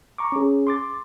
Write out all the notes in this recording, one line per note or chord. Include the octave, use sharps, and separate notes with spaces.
A#5 C#6 D6
C#4 G#4
C6 D6 A6